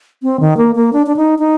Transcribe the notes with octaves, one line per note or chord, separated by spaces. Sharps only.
C4
D#3
A#3
A#3
D4
D4
D#4
D#4